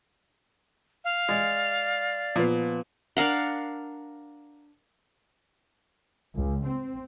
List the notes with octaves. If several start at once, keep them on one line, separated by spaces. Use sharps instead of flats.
F5
G#3 D5
A#2 F3 B3
D4 A#4 F5 F#5
C#2
C4